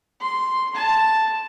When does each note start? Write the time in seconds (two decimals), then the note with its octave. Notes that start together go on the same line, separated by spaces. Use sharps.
0.20 C6
0.74 A5